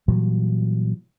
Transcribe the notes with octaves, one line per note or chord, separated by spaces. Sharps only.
A#2 E3 F#3 G3